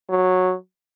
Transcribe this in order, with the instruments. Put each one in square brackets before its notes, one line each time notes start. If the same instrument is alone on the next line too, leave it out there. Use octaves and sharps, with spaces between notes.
[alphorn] F#3